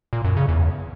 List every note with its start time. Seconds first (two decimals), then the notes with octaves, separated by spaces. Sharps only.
0.13 A#2
0.25 F#2
0.37 C#3
0.49 E2